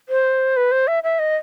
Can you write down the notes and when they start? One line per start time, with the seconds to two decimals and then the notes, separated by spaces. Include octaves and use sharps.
0.09 C5
0.57 B4
0.72 C5
0.87 E5
1.04 E5
1.19 D#5